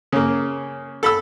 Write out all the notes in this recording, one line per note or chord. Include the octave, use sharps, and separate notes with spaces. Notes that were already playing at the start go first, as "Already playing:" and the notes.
C#3 A#3
A4 B5 E6